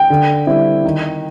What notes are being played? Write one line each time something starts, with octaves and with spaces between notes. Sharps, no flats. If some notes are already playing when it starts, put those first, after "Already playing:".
Already playing: G5
D3
G3 C4 E4
D#3